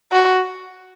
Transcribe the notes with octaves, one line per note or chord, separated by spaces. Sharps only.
F#4